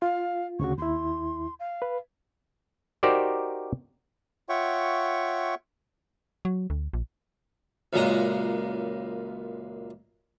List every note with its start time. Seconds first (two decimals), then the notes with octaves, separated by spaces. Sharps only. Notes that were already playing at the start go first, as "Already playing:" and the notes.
0.02 F4 F5
0.60 D2 C#3 F#4 C#6
0.78 D#2 E4 C6
1.60 F5
1.82 B4
3.03 D#4 F#4 G4 A#4 C5 D5
4.49 F4 C#5 E5 F#5 G5 C#6
6.45 F#3
6.70 D2
6.93 A#1
7.93 C#2 F#2 A#2 G#3 A#5